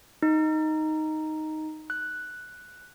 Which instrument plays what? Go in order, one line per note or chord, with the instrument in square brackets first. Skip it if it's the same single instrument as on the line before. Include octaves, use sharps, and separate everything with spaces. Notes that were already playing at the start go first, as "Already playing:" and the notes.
[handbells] D#4
F#6